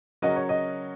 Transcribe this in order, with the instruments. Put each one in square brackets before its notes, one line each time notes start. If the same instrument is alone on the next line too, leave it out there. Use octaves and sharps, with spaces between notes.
[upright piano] C#3 F#3 C#4 F#4 A#4 [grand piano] D#5
[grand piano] C#5
D#5